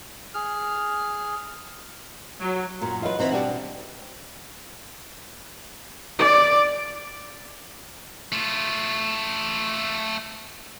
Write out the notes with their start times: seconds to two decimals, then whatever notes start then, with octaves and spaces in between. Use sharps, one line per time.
0.35 G#4 F6
2.40 F#3
2.81 F#2 A#2 A#5
3.02 E3 F#3 F4 B4 D#5
3.19 E3 C4 D#4 F#4 A#5 B5
3.32 B2 G3 D4 F#4 G5
6.18 D5
8.32 A3 F4